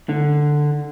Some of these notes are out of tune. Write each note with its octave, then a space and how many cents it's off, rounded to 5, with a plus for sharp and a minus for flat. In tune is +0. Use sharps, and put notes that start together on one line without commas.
D3 +10